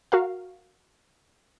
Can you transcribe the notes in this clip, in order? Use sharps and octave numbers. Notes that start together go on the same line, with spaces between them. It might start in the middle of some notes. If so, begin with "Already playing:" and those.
F#4 A#4 F5